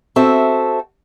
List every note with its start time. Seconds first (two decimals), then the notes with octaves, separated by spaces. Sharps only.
0.16 C4 F#4 A4 E5